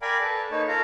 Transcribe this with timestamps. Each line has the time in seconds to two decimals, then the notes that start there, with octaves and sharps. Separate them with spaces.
0.02 A#4 D5 F5 G5 G#5 B5
0.20 A4 B4
0.51 A#3 D#4 B4 C#5
0.68 F4 A4 A#4 F5 A#5